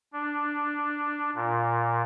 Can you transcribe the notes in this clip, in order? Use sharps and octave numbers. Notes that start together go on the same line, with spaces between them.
D4
A#2